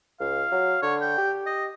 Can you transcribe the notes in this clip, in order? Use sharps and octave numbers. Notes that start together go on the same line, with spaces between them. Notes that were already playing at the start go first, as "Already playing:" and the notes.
C#2 F5
F#3
D3 C#5
G5
G4
D#5